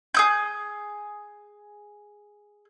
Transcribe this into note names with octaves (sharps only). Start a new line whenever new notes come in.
G#4 D#6 G6